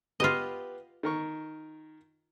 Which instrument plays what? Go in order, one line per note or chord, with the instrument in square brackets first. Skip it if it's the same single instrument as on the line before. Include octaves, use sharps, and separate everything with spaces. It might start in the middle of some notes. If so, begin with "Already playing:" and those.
[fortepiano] B3 G4 B4 [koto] F4 D#5
[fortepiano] D#3 A#4 C#6